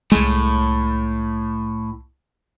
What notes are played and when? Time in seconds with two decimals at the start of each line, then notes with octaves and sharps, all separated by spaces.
0.12 C2 A2 G#3